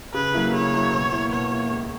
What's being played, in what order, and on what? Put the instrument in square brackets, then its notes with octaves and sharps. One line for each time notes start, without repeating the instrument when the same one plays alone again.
[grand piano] C#3 [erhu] B4
[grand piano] F#3 A#3 E4
[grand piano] C#3 [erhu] C#5
[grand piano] F#3 A#3 E4
B2
A#3 E4
[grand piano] B2 [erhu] C#5
[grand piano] A#3 E4
C#2